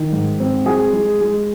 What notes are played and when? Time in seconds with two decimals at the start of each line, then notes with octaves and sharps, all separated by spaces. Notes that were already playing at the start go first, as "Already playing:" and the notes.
Already playing: D#3
0.12 G#2
0.40 C4
0.66 G#3 G#4
0.93 G#3
1.21 G#3